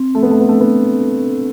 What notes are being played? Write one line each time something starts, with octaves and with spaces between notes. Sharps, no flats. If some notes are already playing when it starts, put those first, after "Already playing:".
Already playing: C4
A3 A4
B3
A3
B3
A3 D4
B3
A4